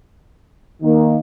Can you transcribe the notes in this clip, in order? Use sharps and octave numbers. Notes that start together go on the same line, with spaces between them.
D#3 A#3